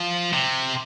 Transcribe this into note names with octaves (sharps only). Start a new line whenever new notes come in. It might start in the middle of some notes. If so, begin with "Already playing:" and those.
Already playing: F3
C3